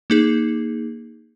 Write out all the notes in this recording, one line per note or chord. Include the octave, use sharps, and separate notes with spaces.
A#3 D#4 G#4